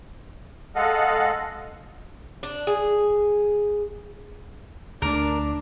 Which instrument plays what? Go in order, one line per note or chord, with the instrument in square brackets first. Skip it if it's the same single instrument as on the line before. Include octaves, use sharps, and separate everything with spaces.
[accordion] G#3 A4 D#5 F5 F#5
[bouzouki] D4
G#4
[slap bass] D2 A3 [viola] D4 [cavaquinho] A#4